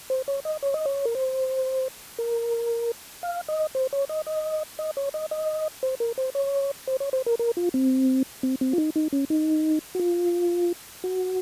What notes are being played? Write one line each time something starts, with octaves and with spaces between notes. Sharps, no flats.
C5
C#5
D#5
C#5
D#5
C#5
A#4
C5
A#4
F5
D#5
C5
C#5
D#5
D#5
D#5
C#5
D#5
D#5
C5
A#4
C5
C#5
C5
C#5
C5
A#4
A#4
F4
C4
C4
C4
F4
D#4
D#4
C#4
D#4
F#4
F4
F#4